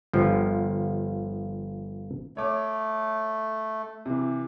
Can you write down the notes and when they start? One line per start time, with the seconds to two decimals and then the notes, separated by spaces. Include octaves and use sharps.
0.13 G1 F3
2.37 A3 C#5 D6
4.06 C3 E3